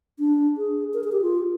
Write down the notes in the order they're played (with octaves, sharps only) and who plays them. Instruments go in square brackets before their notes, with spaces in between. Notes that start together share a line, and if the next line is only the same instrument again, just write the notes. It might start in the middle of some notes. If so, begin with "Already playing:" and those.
[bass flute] D4
G#4
A#4
G#4
G4
F4